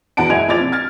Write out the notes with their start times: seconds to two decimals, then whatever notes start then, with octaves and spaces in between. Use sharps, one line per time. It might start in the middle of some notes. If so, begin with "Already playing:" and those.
0.17 E2 F#4 F#5 A5 D7
0.30 F#1 G#3 E4 G#5 G#6 F7
0.49 A#1 F3 D5 A6 F7
0.60 C3
0.72 F6 G#6 A6